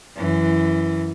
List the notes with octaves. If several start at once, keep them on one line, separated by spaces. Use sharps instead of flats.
F#2 E3